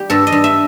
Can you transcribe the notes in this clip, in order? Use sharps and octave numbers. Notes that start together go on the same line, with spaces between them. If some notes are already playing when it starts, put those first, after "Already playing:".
Already playing: G3 G4
G2 A4
D#5
G2
E5